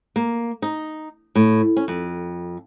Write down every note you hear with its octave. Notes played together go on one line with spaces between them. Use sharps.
A#3
D#4
A2
C#4
F2